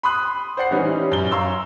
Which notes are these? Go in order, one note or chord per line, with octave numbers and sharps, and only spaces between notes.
B5 C6 D#6 F#6
C5 D5 F#5 C7
E3 G3 C#4 D#4
F#2 G7
F5 A#5 C6 C#6 E6